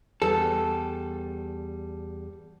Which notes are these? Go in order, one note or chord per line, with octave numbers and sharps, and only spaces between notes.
E2 G3 A4